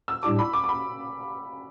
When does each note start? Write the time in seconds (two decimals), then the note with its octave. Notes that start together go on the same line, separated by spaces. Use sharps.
0.08 E6
0.22 A2 G3 D4 G4 D6
0.39 B5
0.53 D6
0.64 D6
0.69 B5